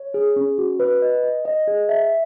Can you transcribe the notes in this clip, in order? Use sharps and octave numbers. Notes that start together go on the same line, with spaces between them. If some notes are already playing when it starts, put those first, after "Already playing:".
Already playing: C#5
G#4
C#4
F#4
B4
D#5
D#5
D#5
G#4
E5